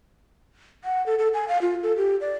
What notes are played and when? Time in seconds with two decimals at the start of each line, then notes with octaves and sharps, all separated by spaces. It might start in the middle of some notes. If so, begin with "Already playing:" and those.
0.84 F#5
1.06 A4
1.19 A4
1.34 G#5
1.48 F5
1.62 F4
1.83 A4
1.97 G4
2.21 D5